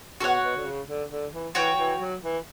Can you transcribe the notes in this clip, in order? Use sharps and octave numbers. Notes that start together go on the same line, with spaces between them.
B2 F#4 A4 C#5 F#5
B2
D3
C#3
D3
D3
E3
E3 F#4 C#5 G5
E3
F#3
E3